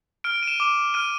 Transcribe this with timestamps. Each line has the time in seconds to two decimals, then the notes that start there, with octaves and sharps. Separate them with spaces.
0.24 F6 D7
0.43 D#7
0.47 E7
0.60 D6
0.94 F6 D#7